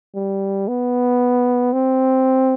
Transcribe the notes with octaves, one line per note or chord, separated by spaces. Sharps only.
G3
B3
C4